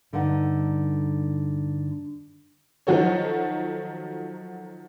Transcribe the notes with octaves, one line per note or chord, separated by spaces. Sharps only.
G2 D3 D#4 B4 F#5
D#3 F3 F#3 F#4 A4 C#5